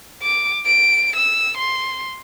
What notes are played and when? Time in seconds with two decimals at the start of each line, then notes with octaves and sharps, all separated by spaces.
0.22 D6
0.66 D7
1.16 E6
1.57 C6